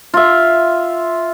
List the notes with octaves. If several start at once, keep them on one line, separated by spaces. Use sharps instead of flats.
F4 E5